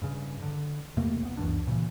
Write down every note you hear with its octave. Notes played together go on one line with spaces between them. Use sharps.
G2 C#3
D3
E2 C3 A3 A#3
C2 B3
C#2 F#2 E3 D4
A#2 C#3 E3